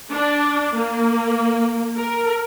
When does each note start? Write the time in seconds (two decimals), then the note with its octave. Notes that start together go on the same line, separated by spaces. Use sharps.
0.11 D4
0.74 A#3
1.98 A#4